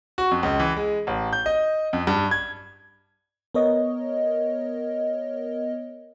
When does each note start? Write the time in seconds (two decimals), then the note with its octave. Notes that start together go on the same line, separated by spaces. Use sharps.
0.18 F#4
0.31 F2
0.43 C#2
0.60 E3
0.77 G#3
1.07 A1
1.33 G6
1.46 D#5
1.93 F2
2.07 G2
2.31 G#6
3.54 B3 A#4 C#5 D#5